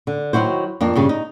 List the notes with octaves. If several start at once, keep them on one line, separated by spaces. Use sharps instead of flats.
D3
D#3 F#3 E4 F#4 C5
F2 A#3 D4
G2 C#3 G3
D#4